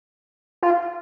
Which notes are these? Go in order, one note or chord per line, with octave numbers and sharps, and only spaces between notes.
F4